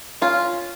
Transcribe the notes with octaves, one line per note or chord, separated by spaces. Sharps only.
C#4 F4